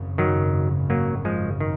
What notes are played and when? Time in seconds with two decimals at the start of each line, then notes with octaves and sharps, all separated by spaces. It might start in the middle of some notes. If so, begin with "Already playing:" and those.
Already playing: G#1 F#2 C#3
0.18 D#3 F#3
0.90 F#3 A#3
1.25 F3 G#3
1.60 D#3